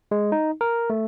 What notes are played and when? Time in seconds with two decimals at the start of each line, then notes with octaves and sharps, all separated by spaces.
0.11 G#3
0.32 D#4
0.61 A#4
0.90 A3